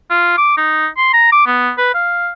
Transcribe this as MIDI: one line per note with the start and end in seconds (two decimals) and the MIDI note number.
0.10 0.35 65
0.38 0.57 86
0.57 0.87 63
0.98 1.11 84
1.13 1.28 82
1.32 1.47 86
1.47 1.71 59
1.78 1.90 71
1.94 2.31 77